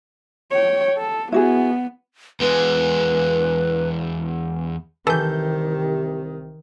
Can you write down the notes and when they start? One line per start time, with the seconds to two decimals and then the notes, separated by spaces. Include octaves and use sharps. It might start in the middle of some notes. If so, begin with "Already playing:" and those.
0.51 C#5 G5
0.98 A4
1.32 B3 E4 F#4 G#4
2.40 E2 G#3 B4
5.07 C2 C3 D#3 E3 A4 G6